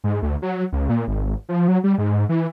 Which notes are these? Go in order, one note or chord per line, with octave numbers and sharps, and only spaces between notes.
G#2
D2
F#3
C#2
A#2
G#1
F3
F#3
G3
G#2
E3